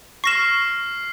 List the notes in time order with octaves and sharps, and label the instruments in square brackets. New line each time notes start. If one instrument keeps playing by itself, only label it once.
[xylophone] C#6 A#6 E7 [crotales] F6 C7